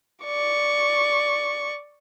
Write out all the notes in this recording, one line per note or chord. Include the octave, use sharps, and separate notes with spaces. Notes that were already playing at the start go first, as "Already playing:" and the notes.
D5 C#6